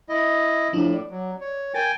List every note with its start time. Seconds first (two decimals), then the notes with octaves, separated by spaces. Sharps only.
0.09 E4 D#5
0.73 A2 F3 D4 E4
0.94 D5
1.11 F#3
1.41 C#5
1.74 A#4 G5 G#5 A6